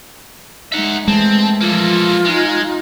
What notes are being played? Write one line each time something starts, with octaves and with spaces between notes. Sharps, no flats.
G#3 D#4 E5 F#5
E3 G#3 A3 C4 A5
E3 F3 A#3 F4 A4
G#3 D#4